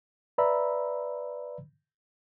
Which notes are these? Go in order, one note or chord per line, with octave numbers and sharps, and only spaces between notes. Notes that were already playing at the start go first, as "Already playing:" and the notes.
B4 D5 E5 A#5 B5 E6